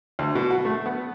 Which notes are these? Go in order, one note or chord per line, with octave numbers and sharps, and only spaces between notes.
D2
B2
F#4
A3
B3